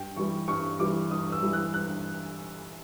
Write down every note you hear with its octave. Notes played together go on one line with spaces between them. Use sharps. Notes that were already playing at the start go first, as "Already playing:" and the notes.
Already playing: G2 G5
E3 G3 C#6
G2 C#6
E3 G3 D6
G2 D#6
E6
E3 G3
F#6
G2 F#6